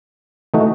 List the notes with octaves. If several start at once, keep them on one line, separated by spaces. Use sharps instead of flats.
E3 A3 D#4 F#4